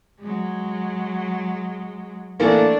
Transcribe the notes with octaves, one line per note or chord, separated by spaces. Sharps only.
F#3 G#3
E3 A3 A#3 D4